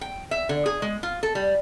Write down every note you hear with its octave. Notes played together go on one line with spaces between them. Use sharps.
G5
E5
D3
G#4
G#3
F4
A4
G3